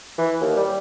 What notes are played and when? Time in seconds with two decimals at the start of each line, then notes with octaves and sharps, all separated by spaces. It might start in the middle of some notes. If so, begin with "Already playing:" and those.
0.18 E3
0.41 D#2
0.57 G3